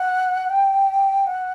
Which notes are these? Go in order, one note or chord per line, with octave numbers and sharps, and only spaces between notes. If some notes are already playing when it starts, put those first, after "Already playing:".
Already playing: F#5
G5
F#5